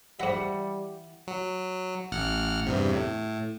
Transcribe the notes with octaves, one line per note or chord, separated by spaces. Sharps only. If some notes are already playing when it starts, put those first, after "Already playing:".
G#2 E3 G3 E5 F#5
F#3
A1 F#5 F6
E2 G2 C3
A2